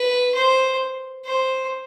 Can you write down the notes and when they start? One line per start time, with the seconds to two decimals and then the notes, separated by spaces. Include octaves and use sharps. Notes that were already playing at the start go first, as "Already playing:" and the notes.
Already playing: B4
0.34 C5
1.25 C5